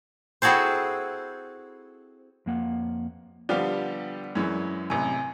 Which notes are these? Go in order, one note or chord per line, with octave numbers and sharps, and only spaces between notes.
C4 E4 F#4 G#4 A4 C5
F2 A#3 F#5
D3 F3 G3 B3 G4 D5 F5
F#2 E3 G#3
A1 C3 G#5